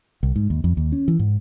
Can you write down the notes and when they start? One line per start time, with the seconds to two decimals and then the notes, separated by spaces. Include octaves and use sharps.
0.23 C2
0.36 G#2
0.50 D#2
0.64 F2
0.77 D#2
0.92 C#4
1.08 E3
1.19 G#2